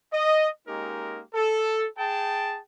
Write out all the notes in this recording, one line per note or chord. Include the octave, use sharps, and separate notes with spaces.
D#5
G#3 A#3 C#4 D#4 G4 A#4
A4
G#4 G5 A5